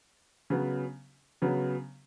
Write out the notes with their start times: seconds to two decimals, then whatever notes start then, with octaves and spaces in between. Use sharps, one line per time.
0.50 C#3 F#3 B3
1.42 C#3 F#3 B3